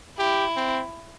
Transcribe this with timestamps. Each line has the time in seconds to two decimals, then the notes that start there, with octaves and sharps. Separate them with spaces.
0.19 E4 G4
0.56 C4